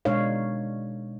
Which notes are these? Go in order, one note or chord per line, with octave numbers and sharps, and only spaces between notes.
B2 G#3 D4 D#4 C#5 F5